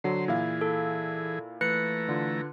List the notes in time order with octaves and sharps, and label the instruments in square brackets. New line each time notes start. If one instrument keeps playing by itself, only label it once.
[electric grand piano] D3 F#3 [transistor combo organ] C5 C6
[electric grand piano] A#2 E4 F5 [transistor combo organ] E3 G#4
[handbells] A4
[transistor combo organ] E3 A3 A#5 [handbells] B4 F#6 C#7
[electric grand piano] D3 F4